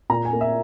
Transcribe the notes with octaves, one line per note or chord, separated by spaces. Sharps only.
A#2 A#5
G#5
A#3
E5